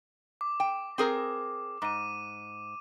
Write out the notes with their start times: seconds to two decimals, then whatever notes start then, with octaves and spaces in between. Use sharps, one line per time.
0.41 D6
0.60 G5
0.98 C4 G#4 A#4
1.82 G#2 D6 D#7